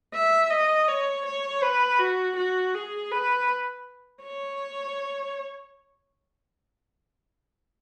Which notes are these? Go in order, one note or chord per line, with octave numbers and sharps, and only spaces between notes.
E5
D#5
C#5
C#5
B4
F#4
F#4
G#4
B4
C#5